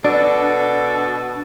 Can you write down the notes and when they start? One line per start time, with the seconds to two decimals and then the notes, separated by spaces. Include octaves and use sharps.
0.04 B2 D4 A4 D5